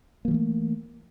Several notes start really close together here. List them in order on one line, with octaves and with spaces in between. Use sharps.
A#3 F3 E3 A3